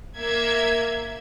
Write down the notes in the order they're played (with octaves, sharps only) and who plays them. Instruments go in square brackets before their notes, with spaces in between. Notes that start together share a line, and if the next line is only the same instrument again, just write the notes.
[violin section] A#3 E5 G#6